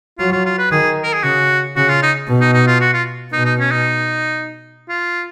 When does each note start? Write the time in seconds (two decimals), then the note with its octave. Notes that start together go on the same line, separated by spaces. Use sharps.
0.19 F#3 F4
0.32 F4
0.45 F4
0.58 B4
0.71 D#3 G#4
1.03 A#4
1.13 G#4
1.23 C#3 F#4
1.76 C#3 F#4
1.89 F4
2.03 D#4
2.28 B2
2.41 D#4
2.54 D#4
2.67 F4
2.81 F#4
2.94 F4
3.32 B2 D#4
3.45 D#4
3.59 C#4
3.71 D#4
4.89 F4